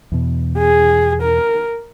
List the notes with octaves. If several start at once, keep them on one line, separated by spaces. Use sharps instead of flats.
E2 B2
G#4
A#4